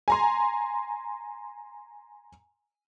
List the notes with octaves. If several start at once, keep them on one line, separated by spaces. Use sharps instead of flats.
G#5 A#5 C6